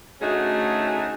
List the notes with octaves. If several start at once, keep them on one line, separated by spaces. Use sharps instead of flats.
D2 A3 C#4 D#4 F#4 G#4